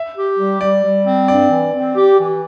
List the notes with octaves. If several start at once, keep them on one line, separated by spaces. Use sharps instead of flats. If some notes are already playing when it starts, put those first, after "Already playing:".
Already playing: E5
G4
G3
G3 D5
G3
C4
G2 D5
E3
C4
G4
E3